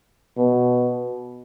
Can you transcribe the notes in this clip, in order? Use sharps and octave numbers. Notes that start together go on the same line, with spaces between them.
B2